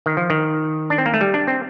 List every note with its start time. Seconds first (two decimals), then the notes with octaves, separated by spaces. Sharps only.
0.06 D#3
0.17 F3
0.30 D#3
0.90 D4
0.98 C4
1.06 A#3
1.14 A3
1.21 G3
1.34 D4
1.47 C4